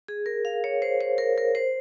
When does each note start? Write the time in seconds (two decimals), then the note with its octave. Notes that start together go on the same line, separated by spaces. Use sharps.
0.08 G#4
0.26 A#4
0.45 F5
0.64 C#5
0.82 C5
1.01 C5
1.18 A#4
1.38 A#4
1.55 C5